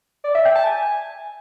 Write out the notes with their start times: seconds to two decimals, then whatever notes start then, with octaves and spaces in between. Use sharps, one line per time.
0.24 D5
0.35 E5
0.45 G5
0.55 A5
0.66 G#5